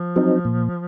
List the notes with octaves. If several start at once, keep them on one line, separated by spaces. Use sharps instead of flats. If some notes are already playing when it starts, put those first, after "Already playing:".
Already playing: F3
F#3 C4 D#4
A#2